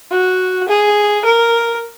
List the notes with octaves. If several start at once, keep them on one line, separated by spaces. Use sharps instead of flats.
F#4
G#4
A#4